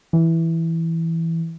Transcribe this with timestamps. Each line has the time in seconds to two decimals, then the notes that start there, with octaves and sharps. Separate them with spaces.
0.13 E3